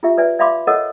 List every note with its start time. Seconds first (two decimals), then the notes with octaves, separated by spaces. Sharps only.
0.03 F4 G4 E5
0.18 B4 D5 E5 G#5
0.39 D5 E5 F5 B5 C6 D6
0.67 A4 A#4 C#5 D#5 F#5